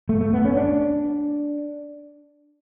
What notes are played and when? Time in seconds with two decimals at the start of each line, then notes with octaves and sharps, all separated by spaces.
0.09 A3
0.21 A3
0.33 B3
0.45 C#4
0.57 D4